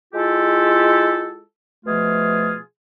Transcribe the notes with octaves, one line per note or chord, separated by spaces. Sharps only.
G#3 E4 F4 G4 A4
B2 F3 A3 F4 G#4